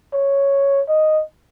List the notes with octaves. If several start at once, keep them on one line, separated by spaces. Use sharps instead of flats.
C#5
D#5